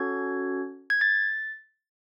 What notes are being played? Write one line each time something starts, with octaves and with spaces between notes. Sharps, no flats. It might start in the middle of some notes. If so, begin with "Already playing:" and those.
Already playing: C#4 F#4 A4 G#6
G#6
A6